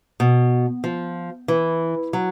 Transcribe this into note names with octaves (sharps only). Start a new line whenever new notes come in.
B2
F3
E3
F#3